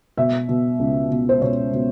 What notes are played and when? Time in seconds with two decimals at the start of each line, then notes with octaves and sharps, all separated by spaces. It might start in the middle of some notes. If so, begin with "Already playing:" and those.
0.18 B2 E5
0.49 B2
0.79 C#2
1.10 B2
1.29 C5
1.41 B2 C#5
1.73 B2